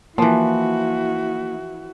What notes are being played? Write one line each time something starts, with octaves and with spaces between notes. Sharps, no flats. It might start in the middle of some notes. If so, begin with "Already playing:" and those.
E3 F3 A#3 E4 F#4